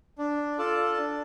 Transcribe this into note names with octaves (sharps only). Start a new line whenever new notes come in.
D4
F4 A4 D5 A5
D4